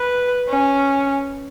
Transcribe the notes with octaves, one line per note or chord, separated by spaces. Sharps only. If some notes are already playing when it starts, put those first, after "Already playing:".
Already playing: B4
C#4